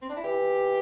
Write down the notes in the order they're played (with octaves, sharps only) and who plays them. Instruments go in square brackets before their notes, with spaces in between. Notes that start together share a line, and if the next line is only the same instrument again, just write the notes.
[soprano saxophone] C4
D4
E4
[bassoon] E3 [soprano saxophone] G4